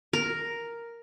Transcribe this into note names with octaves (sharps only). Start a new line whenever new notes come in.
A#4